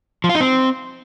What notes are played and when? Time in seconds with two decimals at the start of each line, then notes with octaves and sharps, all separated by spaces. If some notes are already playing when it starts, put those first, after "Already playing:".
0.24 F3
0.29 F4
0.35 D#4
0.41 C4